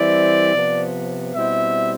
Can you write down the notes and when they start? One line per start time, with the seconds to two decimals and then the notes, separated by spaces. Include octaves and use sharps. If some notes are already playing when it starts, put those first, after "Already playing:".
Already playing: E3 G3 C4 E4 D5
0.54 C3 F3 B3
1.35 B2 G3 C4 E4 E5